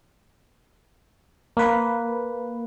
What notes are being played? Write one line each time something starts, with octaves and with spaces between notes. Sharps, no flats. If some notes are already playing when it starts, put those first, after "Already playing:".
A#3 B4